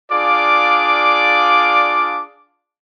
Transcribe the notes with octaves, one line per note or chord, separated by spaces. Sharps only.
D4 F4 G#4 D5 F5 D6